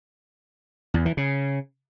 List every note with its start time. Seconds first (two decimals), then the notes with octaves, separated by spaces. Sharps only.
0.94 E2
1.06 E3
1.17 C#3